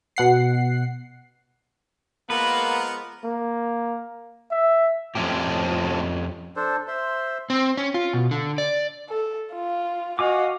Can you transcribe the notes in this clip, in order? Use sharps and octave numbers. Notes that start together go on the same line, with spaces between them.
B2 F#5 C7
F3 G#3 A#3 B3 A#4 B4 F#5
A#3
E5
F2 A2 F3 C#4 G4
D4 A4 C5
C5 E5 C6
C4
C#4
F4
B2
D3
D5
A4
F4
F#4 D#5 F5 G#5 D6